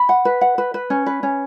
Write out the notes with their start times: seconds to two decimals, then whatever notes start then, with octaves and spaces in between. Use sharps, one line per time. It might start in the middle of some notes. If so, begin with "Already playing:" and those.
Already playing: B5
0.09 F#5
0.25 B4
0.41 F#5
0.58 B4
0.74 B4
0.90 C#4
1.06 B4
1.23 C#4